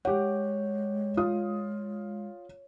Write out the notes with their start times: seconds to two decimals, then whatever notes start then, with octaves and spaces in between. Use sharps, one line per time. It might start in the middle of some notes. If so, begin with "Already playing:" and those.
0.05 G#3 G4 C#5 F#5
1.17 F4 D#6